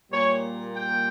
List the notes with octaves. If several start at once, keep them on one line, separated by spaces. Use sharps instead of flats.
A#2 G3 A#3 C#5
G5